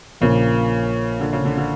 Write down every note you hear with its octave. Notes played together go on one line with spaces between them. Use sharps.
A#1 A#2 C#3 A#3
D3
C#3
D3
D3